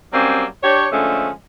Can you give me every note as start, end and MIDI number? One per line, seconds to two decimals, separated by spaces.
0.13 0.45 54
0.13 0.45 55
0.13 0.45 58
0.13 0.45 60
0.13 0.45 61
0.63 0.87 62
0.63 0.87 67
0.63 0.87 73
0.92 1.29 50
0.92 1.29 53
0.92 1.29 56
0.92 1.29 57
0.92 1.29 61